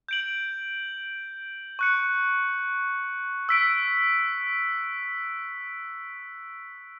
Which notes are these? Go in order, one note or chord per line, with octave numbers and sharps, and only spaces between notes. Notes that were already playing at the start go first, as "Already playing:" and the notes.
G6 D7 F#7
C#6 F#6 C#7
E6 B6 D7